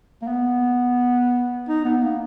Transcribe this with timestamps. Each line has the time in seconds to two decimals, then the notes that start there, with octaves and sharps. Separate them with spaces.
0.22 A#3
0.27 B3
1.68 D#4
1.85 B3
2.03 A#3